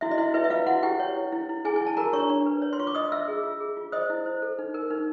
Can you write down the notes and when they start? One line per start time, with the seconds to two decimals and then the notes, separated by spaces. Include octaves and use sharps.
0.01 E4 F#4 E5
0.11 D#5
0.18 E4 F#4 E5
0.34 E4 B4 E5
0.44 E5
0.50 F4 B4 F5
0.66 E4 F#4 F#5
0.83 E4 G4 G5
0.99 C#5
1.16 E4
1.32 E4
1.49 E4
1.65 E4 G#4 G#5
1.76 G#5
1.82 E4 A5
1.97 F#4 A#4 A#5
2.13 D4 C#5 C#6
2.29 D4
2.46 B4
2.62 C#5
2.73 C6
2.79 F4 C#6
2.87 D6
2.95 F4 D#5 D#6
3.12 F4 E5 E6
3.28 G#4
3.43 F4
3.61 G#4
3.77 F4
3.92 C5 D#5 D#6
4.10 E4
4.26 C5
4.42 A4
4.59 D#4
4.74 A#4
4.90 D#4